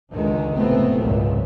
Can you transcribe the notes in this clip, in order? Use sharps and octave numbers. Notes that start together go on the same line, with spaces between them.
C#2 D3 D#3 G#3
F1 A2 A3 B3 C4
G#1 C#2 F#2 A#2